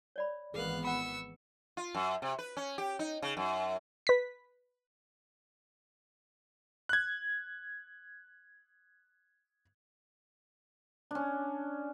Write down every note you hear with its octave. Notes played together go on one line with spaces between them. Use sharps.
C#5 D5 B5
G#1 E3 B3 G#4 A#4 F5 F#6
F#5 B5 C#6 E6
F4
F#2
C3
B4
C#4
G4
D#4
C#3
F#2
B4 B6
F#6 G#6
C#4 D4